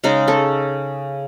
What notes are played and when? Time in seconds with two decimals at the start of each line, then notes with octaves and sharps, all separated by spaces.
0.04 C#3 G#3 D#4
0.27 C#4 A4